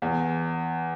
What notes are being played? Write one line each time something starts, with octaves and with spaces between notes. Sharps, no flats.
E2